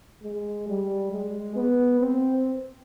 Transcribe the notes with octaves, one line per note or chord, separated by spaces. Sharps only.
G#3
G3
G#3
B3
C4